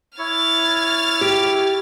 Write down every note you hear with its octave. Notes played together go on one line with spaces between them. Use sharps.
E4 C#5 F6 A6
G4